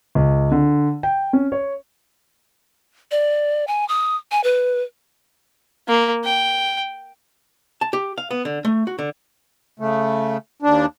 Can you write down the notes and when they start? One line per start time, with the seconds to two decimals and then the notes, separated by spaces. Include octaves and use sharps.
0.15 C#2
0.52 D3
1.03 G5
1.33 C#4
1.52 C#5
3.11 D5
3.68 G#5
3.89 D#6
4.31 G#5
4.44 B4
5.88 A#3
6.24 G5
7.81 A5
7.93 G4
8.18 F5
8.31 B3
8.45 D3
8.65 A3
8.87 F#4
8.99 D3
9.80 C#3 A3
10.62 D#2 D4